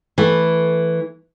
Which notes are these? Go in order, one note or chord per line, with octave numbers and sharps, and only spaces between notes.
E3 A3